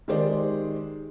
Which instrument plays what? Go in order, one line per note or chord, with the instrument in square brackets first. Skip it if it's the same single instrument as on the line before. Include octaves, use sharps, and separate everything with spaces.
[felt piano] D#3 G#3 G4 C5 D5